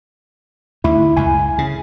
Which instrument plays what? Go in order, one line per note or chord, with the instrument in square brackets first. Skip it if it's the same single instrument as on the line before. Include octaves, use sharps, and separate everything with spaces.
[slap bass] D2 G#2 [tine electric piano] E4
[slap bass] C#2 F#2 [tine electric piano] G#5
[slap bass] C#3